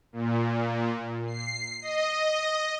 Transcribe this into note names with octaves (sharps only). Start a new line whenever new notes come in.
A#2
C7
D#5